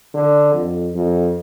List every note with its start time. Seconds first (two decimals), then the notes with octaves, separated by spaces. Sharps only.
0.14 D3
0.53 F2
0.94 F2